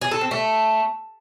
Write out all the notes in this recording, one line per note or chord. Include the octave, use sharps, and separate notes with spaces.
G#4
A4
C4
A3